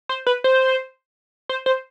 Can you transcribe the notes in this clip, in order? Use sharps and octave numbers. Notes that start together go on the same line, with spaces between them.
C5
B4
C5
C5
C5